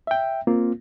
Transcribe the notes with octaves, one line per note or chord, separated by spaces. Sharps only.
E5 G5
A#3 C4 F4